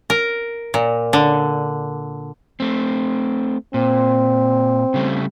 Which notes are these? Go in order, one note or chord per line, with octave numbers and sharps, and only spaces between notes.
A#4
A#2
D3
A3 C4
A#2 C4
C#3 G3 A3